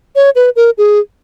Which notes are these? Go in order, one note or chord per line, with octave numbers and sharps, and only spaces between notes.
C#5
B4
A#4
G#4